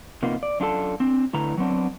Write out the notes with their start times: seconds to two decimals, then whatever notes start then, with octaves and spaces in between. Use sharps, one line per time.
0.23 C3 A#3 B3 D#4 F4
0.43 D5
0.60 F#2 D4 F4 G4 A4 A5
1.00 C4 D4
1.33 A2 D3 E4 B4 A#5
1.58 F#3 B3 C4 D4